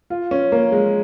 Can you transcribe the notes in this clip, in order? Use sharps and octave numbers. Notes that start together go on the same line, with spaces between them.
F4
C#4
A#3
G#3